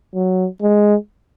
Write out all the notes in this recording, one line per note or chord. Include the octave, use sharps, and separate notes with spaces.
F#3
G#3